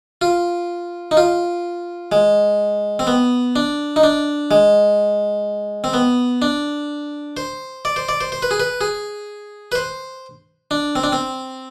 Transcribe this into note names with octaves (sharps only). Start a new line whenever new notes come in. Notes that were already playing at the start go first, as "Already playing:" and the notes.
F4
D#4
F4
G#3
C4
B3
D4
D#4
D4
G#3
C4
B3
D4
C5
D5
C5
D5
C5
C5
B4
G#4
B4
G#4
B4
C5
D4
C4
D4
C4